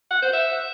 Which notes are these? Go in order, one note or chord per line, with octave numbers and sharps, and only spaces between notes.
F#5
C5
E5